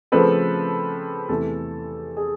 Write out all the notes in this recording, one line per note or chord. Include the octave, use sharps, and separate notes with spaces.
C#3 F3 A3 C4 A4 B4
E2 C3 E3 A3 A4
G#4